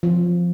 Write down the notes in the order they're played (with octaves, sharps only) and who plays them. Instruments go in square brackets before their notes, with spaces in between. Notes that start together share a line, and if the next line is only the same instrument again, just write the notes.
[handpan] F3